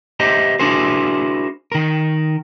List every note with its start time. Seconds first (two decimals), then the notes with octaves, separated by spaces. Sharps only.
0.20 G4 C5 D#5 E5 A#5
0.59 D4 E4 F#4 G#4 A#4 C5
1.72 D#3 A#4